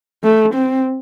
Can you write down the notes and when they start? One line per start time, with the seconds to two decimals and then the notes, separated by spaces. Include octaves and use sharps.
0.23 A3
0.55 C4